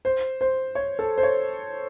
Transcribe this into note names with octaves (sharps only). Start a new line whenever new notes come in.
C5
C5
C#5
A4
C5
C#5